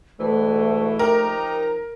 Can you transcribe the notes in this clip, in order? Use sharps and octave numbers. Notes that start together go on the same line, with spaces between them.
D2 G#2 B2 E3 A3
F3 D#4 G4 A#4 A#5